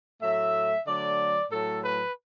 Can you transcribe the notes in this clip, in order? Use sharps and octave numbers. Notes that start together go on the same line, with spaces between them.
A2 F#3 A3 E5
D3 F#3 A3 D5
A2 F#3 A3 A4
B4